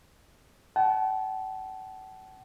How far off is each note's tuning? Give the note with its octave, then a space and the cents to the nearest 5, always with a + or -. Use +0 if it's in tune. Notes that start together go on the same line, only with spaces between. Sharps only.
F#5 +40 A5 -35